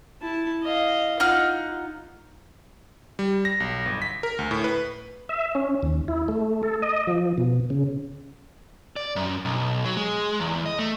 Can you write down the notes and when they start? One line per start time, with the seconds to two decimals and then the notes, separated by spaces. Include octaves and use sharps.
0.22 E4 A5
0.63 D#5 F5
1.20 D#4 F4 F#5 F6
3.19 G3
3.45 A#6
3.60 B1
3.86 G1
4.02 B6
4.23 A#4
4.39 D2
4.51 A2
4.64 B4
5.29 E5
5.55 C#4
5.83 D#2
6.08 E4
6.28 A3
6.63 A4
6.82 D#5
7.07 F3
7.38 B2
7.70 C#3
8.96 D5
9.16 F#2
9.45 B1
9.85 F#3
9.97 G#3
10.40 E2
10.66 D#5
10.79 A3